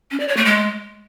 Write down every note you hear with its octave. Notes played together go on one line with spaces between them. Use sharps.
C#4
D5
C#5
A3
G#3